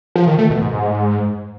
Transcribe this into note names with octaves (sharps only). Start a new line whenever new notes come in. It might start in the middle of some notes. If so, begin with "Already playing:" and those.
F3
D#3
A3
B2
G#2